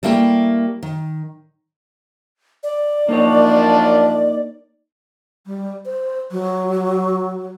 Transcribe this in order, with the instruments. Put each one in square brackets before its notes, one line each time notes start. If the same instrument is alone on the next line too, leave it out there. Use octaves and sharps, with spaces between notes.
[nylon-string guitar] G3 A3 A#3 E4 G4
D#3
[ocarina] D5
[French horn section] F#2 F3 D4 [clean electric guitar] A#3 D#4 C#5
[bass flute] G3
C5
F#3